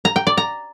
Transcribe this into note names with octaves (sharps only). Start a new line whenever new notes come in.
A#5
G5
D5
A#5